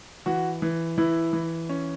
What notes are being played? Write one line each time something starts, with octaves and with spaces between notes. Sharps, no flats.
E3 F#4
E3
E3 E4
E3
C#4